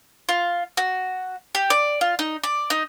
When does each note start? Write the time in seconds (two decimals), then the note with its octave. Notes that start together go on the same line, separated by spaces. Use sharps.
0.29 F4
0.77 F#4
1.55 G4
1.70 D5
2.01 F4
2.19 D#4
2.43 D5
2.70 D#4